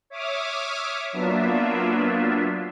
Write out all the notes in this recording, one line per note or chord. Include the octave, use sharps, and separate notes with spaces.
C#5 E5 D6 D#6 F6
F#3 A#3 B3 D4 F4 E5